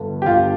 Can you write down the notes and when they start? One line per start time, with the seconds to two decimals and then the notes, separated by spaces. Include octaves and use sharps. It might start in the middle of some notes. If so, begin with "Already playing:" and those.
Already playing: G1 G2 D3
0.22 G4
0.26 G1 F4